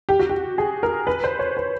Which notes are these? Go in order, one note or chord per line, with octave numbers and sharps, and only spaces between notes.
G4
F#4
G4
G#4
A#4
B4
C5
C#5
B4